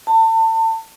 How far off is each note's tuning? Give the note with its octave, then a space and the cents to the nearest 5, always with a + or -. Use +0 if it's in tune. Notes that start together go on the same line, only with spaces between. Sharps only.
A5 +35